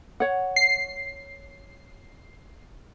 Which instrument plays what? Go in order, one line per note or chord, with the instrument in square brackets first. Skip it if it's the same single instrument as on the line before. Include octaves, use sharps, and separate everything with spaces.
[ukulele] C#5 F#5
[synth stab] C7